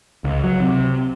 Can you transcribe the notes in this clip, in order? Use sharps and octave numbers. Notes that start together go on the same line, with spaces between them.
C#2
F#3
C3